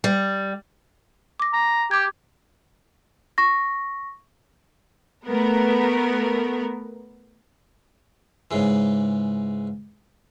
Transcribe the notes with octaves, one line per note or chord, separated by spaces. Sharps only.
G3
D6 A#6
A#5
G4 D6 G#6
C#6 A#6
A3 B3 A#4
G#2 C#3 E3